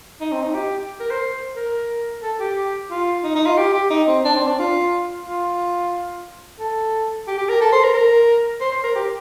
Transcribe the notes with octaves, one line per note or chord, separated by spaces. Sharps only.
D#4
C4
D#4
G4
A#4
C5
A#4
A4
G4
F4
D#4
D#4
F4
G4
G4
D#4
C4
D4
C4
D4
F4
F4
A4
G4
G4
A#4
A4
C5
A#4
A#4
C5
C5
A#4
G4